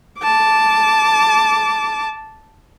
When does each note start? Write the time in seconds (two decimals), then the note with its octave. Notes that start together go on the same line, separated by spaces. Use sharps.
0.20 A5 D6